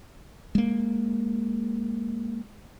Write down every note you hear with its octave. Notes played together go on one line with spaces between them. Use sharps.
G#3 A#3